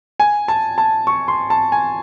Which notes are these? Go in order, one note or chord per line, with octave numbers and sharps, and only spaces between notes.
G#5
A5
A5
C#6
C6
A5
G#5